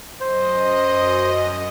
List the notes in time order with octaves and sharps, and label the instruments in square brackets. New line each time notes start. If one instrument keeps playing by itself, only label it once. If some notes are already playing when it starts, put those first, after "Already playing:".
[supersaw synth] F#2 D#5 [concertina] C5